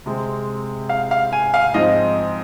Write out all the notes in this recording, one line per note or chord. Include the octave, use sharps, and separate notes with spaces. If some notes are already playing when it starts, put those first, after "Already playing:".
C3 G#3 C4
F5
F5
G#5
F5
G#2 F3 C4 D#5